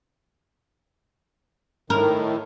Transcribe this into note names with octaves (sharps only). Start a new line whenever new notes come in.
A2 D#3 A#4